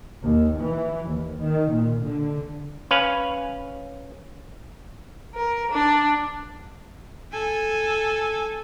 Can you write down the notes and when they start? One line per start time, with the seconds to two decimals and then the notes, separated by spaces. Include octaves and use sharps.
0.23 D#2
0.60 E3
1.08 D#2
1.40 D#3
1.73 A#2
2.06 D3
2.91 C#4 B4 F5
5.34 A#4
5.71 D4
7.32 A4 G#5